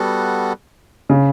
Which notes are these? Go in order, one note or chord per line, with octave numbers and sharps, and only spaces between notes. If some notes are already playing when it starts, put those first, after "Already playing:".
Already playing: G3 B3 F#4 A4
C#3